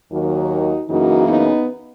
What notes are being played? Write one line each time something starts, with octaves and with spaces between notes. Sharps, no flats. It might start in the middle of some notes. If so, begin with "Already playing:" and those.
D#2 D#3 F#3 A#3 D#4 F#4
F#2 C#3 E3 A#3 D#4 F#4
B3 D#4